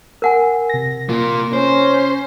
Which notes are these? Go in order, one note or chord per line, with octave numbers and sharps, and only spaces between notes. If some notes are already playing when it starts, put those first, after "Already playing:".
A#4 F#5 G#5
C3 A#6
A#3 F4
C#4 C5